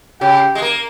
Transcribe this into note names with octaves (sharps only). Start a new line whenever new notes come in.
C#3 G4
G#3
A#3